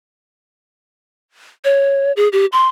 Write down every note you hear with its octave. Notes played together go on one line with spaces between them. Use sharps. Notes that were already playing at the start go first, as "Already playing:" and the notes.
C#5
G#4
G4
C6